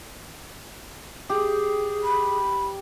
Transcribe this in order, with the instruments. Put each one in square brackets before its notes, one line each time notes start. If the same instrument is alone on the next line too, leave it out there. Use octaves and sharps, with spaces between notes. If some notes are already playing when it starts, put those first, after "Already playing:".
[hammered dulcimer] G4 [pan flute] G#4
[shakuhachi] B5